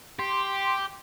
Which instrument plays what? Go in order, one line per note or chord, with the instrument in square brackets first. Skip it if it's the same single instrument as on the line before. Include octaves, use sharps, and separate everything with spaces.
[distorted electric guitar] G4 [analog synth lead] C6